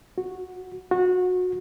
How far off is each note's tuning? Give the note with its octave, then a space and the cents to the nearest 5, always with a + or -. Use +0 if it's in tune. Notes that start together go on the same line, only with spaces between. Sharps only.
F#4 -10
F#4 -25